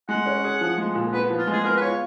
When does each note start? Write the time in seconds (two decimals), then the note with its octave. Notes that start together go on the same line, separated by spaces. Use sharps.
0.09 G#3 F#5
0.26 C#4
0.44 G#4
0.61 F3
0.78 G#3
0.95 A#2
1.13 B3 B4
1.30 F3
1.38 F4
1.47 G#3 G#4
1.64 B3 A#4
1.77 B4
1.81 F4 C#5